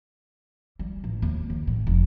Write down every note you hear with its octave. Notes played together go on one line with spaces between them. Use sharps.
G3
A1
D#2
D#3
A2
F1